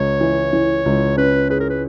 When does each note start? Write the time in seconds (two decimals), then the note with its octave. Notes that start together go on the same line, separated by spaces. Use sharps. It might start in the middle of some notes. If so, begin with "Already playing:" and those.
Already playing: C#2 C#5
0.21 E3
0.53 E3
0.85 C#2
1.17 C#4 B4
1.50 G#4 B4
1.60 A#4
1.70 B4